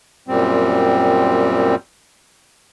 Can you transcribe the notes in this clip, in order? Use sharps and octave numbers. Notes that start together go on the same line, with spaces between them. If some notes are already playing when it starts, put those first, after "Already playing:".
F#2 A#2 G3 C4